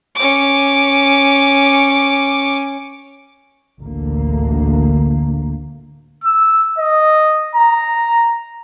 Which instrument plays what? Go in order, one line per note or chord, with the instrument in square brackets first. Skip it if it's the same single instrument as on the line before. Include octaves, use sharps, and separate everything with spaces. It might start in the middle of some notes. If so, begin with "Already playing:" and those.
[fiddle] C#4 D6
[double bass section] A1 D2 D3 A#3
[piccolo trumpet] E6
D#5
A#5